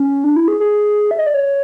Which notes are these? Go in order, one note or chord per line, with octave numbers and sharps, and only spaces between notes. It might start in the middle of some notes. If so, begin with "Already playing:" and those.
Already playing: C#4
D4
E4
G#4
G#4
E5
D#5
D5
C#5